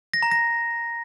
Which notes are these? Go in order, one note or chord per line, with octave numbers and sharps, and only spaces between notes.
A#6
A#5
A#6